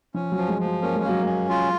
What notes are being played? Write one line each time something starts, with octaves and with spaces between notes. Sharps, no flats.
F3 C#4
F#3
F3
G#3
F3
F#3
A#3 C#4
G#3
F#3 A#3
G#3 C#4
F4